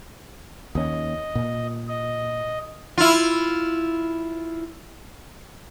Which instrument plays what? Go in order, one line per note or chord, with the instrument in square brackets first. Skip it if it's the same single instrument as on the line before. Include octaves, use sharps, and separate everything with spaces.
[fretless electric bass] D#2 C#4 [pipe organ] D#5
[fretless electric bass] A#2
[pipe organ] D#5
[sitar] E4 F4